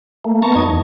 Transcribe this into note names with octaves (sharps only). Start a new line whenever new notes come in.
A3 A#3
B3 A5 A#5 C#6
F#2 D#4 D#5 G#6
E2